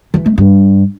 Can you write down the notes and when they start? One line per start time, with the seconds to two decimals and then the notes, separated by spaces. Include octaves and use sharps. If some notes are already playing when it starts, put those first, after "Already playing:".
0.14 E3
0.26 A3
0.38 G2